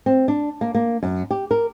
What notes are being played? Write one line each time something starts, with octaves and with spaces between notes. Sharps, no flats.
C4
D4
A#3
A#3
F#2
G4
A#4